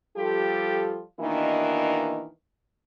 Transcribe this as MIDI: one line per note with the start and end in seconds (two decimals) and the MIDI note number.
0.17 1.02 53
0.17 1.02 55
0.17 1.02 65
0.17 1.02 67
0.17 1.02 69
1.20 2.27 47
1.20 2.27 51
1.20 2.27 52
1.20 2.27 58
1.20 2.27 62
1.20 2.27 63